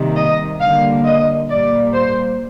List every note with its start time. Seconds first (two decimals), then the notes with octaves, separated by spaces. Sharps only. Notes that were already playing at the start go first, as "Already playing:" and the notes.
Already playing: C3 D#3 G3 A#3
0.16 D#5
0.60 D3 G3 A#3 F5
1.05 D#5
1.49 A#2 G3 A#3 D5
1.93 C5